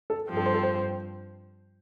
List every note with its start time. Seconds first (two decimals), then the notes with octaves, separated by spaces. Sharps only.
0.10 A4
0.27 G2 F3 C4 G4
0.37 A4
0.46 C5
0.54 A4
0.63 C5